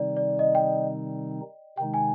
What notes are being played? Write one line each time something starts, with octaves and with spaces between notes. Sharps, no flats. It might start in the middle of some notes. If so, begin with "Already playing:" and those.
Already playing: C3 D#3 G3 C4 D#4 D5
D5
D#5
G5
C3 D#3 G#3 D#4 G5
G#5